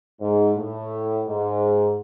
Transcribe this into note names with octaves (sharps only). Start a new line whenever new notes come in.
G#2
A2
G#2